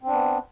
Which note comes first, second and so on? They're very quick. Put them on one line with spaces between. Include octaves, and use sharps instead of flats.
C4 D4 B3